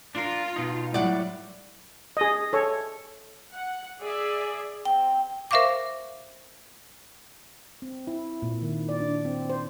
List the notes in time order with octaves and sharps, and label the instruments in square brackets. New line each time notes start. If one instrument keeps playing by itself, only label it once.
[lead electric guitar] D4 A#4 [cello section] F4
[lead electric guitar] B2 D#4
[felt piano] A2 [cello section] F#3 G3 [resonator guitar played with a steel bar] D5 F#5
[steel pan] G#4 D#5
A4 C#5
[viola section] F#5
G#4 D5 E5
[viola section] C4 [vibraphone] G5
[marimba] A#4 C5 E5 F5 C#6 D6
[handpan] C4
E4
A#2
D#3
D5
D4
C4
C5